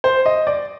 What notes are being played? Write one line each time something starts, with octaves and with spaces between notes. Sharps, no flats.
C5
D#5
D5